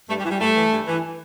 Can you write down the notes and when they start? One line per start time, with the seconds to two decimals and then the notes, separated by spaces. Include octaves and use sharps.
0.09 G2 A3
0.19 G3
0.25 E3
0.30 G3
0.40 G2 A3
0.55 E3
0.72 G2
0.86 E3